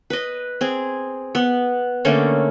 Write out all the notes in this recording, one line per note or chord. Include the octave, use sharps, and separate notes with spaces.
B4 D#5
C4 G#4
B3
D3 A3 A#3 C#4